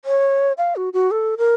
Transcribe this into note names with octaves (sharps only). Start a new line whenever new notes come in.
C#5
F5
F#4
F#4
A4
A#4